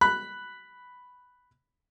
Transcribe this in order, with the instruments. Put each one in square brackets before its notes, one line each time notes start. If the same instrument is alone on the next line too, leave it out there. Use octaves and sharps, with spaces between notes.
[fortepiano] B5 F#6